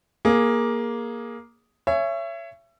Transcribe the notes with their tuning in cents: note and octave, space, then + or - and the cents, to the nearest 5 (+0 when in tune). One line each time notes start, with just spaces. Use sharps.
A#3 +10 G#4 +0
C#5 +0 E5 +30 G#5 +0